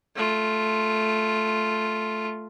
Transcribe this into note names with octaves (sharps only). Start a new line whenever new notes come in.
A3 F4